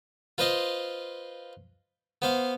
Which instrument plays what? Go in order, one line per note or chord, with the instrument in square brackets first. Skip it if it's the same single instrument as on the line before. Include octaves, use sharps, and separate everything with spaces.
[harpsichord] F4 B4 C5 D#5 F5
B3 C5 F5